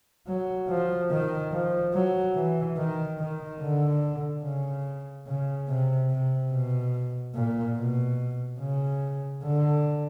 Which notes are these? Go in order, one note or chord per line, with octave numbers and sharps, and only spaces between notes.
F#3
F3
D#3
F3
F#3
E3
D#3
D#3
D3
C#3
C#3
C3
C3
B2
A#2
B2
C#3
D3